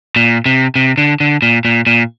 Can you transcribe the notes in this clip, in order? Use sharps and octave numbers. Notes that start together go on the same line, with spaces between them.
A#2
C3
C3
D3
D3
A#2
A#2
A#2